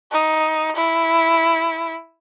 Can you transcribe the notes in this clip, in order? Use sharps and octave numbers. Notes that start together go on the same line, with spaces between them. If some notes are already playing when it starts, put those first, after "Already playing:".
D#4
E4